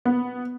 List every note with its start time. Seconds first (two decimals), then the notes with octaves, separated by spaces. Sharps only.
0.05 B3